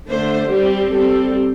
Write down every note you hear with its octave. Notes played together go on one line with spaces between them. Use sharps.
D3 A3 D4 C5
G3 C4 G4
G3 C4 A4